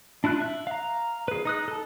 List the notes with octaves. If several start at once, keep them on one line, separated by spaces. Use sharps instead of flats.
D4 E4 F4 F#6
E5 F#6
F5 A#5
G#4 B4
D#4 D#6 F#6
A4 A5